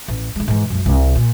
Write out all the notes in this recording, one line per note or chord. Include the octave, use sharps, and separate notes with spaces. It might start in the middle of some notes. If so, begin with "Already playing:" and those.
A1
D3 G#3
G#2 E3
C#2 F#2
C2 C3
A#2